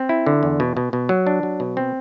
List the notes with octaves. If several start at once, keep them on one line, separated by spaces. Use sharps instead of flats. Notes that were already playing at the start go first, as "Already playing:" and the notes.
Already playing: C4
E4
D3
E2
B2
B2
B2
F#3
D4
F#3
B2
C4